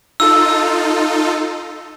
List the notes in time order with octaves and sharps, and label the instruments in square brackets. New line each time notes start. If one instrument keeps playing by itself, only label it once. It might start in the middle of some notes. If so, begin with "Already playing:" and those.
[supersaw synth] D#4 F4 A4 [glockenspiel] E6